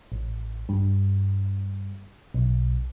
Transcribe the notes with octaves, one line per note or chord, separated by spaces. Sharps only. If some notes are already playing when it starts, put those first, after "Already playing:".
A1
G2
B1